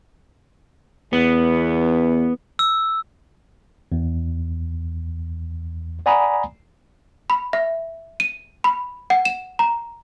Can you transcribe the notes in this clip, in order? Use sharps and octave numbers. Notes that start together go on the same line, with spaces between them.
E2 B3
E6
E2
D5 F#5 G#5 A#5 B5 D#6
B5
E5
D#7
B5
F#5
E7
A#5